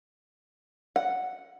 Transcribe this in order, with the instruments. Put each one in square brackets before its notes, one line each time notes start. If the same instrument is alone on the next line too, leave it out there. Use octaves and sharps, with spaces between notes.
[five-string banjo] F#5